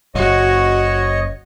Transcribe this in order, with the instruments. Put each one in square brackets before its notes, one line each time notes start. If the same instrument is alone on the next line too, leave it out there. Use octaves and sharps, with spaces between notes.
[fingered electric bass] F#1 [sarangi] F#4 [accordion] C#5 D#5